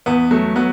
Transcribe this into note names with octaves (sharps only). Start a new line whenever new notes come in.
E2 B3
F#3 A3
F#3 B3